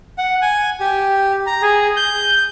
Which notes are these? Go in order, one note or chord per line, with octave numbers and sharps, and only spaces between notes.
F#5
G#5
G4
A#5
G#4
G6